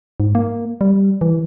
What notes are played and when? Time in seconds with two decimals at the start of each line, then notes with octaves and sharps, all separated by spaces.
0.20 G#2
0.35 A#3
0.81 G3
1.21 E3